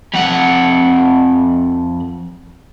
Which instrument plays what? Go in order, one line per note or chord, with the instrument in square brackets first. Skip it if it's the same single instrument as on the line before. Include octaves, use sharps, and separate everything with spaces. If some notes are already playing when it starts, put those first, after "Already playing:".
[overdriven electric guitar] F2 F#5